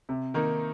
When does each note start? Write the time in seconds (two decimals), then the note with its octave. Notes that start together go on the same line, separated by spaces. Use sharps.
0.09 C3
0.34 D#3 A#3 D#4